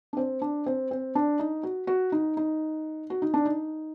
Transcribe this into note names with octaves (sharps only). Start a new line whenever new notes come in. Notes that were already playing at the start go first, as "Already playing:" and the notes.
D4
C4
D4
C4
C4
D4
D#4
F#4
F#4
D#4
D#4
F#4
D#4
D4
D#4